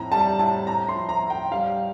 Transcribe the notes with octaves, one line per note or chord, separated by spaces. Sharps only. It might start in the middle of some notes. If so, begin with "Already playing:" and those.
Already playing: F2 A2 A#5
G3 A5
A2 A5
A2 A#5
C6
F3
A#5
A2
G5
G3 F5